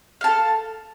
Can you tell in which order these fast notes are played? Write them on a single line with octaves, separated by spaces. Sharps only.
F5 A5 A4